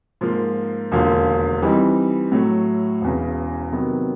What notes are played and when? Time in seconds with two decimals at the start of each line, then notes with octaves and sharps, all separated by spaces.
0.21 G#2 F3 A#3
0.92 E1 D#2 D3 F3 A#3
1.62 E3 G3 C4 D#4
2.32 A2 F#3 A3
3.01 E1 E2 C#3
3.72 C3 D#3 F#3 B3